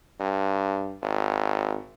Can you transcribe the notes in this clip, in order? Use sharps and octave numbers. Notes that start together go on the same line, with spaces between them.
G2
G#1